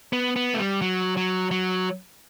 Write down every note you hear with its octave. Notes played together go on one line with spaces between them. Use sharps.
B3
B3
A3
G3
F#3
F#3
F#3